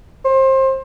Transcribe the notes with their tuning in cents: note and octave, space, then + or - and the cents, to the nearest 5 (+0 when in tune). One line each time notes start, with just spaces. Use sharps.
C5 +25